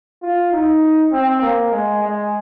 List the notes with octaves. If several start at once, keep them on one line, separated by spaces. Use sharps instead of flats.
F4
D#4
C4
A#3
G#3
G#3